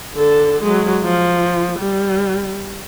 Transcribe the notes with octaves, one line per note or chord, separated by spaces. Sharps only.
D3 A4
F#3 G#3
F3
G3